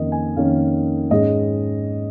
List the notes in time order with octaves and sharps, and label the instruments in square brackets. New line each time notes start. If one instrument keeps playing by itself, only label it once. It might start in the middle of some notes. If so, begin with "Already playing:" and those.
Already playing: [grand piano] F2 D#3 A#3 C#4 D#5
G#5
F2 D#3 A#3 C#4 F5
G#2 G#3 C#4 D#5